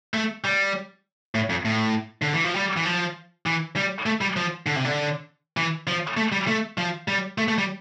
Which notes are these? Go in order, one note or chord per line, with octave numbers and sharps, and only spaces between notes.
A3
G3
A2
F2
A2
D3
E3
F3
G3
E3
F3
E3
G3
A3
G3
F3
D3
C3
D3
E3
F3
A3
G3
A3
F3
G3
A3
A3
G3